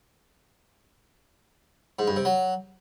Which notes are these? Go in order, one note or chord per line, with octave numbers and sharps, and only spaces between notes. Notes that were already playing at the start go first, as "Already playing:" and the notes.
G#2
G2
C3
F#3